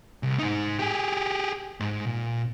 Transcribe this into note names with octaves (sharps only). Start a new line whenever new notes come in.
C2
G#2 D#4
G4 G#4
G#2
A#2